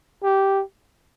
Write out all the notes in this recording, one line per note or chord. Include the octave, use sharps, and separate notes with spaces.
G4